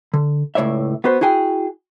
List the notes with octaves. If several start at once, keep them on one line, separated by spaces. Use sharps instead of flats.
D3
C#2 A2 C#5 D5 E5
B3 F#4 B4 C5
E4 F#4 G#4 G5 G#5